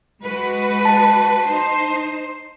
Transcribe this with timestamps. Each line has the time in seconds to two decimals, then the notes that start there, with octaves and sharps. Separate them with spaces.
0.23 G#3 F#4 B4
0.85 A5
1.46 D#4 C5